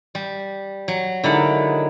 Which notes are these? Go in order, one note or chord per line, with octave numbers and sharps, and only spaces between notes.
G3
F#3
D3 D#3 G#3 E4 D5 F#5